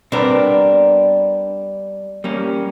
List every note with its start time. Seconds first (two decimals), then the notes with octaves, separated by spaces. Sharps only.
0.12 G3 B3 C4 D4 A#4
2.24 G3 A#3 C#4